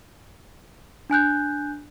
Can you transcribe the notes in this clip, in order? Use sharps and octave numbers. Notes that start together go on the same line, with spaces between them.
D4 G#5 F#6 G6